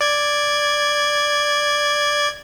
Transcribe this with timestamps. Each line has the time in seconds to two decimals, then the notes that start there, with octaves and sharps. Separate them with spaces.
0.01 D5 G#6